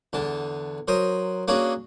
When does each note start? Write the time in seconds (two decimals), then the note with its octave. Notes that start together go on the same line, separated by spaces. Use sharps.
0.13 E2 D3 A5
0.88 F#3 A#4 C5 D#6
1.48 A#3 C#4 D4 F#4 G#4